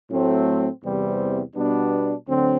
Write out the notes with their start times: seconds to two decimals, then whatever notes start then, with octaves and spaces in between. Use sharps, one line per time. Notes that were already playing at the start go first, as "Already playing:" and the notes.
0.09 A2 F#3 A3 C4
0.83 E2 C3 E3 G3 C4
1.55 B2 G3 B3 D4
2.28 D2 D3 F#3 C4